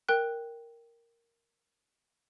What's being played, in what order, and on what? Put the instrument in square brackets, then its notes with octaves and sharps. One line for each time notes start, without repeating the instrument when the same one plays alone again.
[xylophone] A#4 G5 F#6